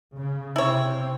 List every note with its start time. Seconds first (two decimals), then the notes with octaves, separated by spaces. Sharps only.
0.17 C#3
0.56 C3 C4 E4 C#5